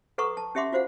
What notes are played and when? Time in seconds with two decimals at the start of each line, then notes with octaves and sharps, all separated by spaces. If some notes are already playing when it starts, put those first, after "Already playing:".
0.18 A4 B4 F#5 A#5 C#6 D#6
0.37 A5
0.55 C#4 G4 E5 F#5 C6 D6
0.72 F4 F#4 C5 F5 F#5